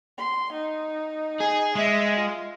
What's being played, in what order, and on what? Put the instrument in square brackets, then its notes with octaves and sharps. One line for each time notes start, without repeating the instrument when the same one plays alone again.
[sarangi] C6
D#4
[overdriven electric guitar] G#4
[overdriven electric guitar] G#3 [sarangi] E5
[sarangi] F4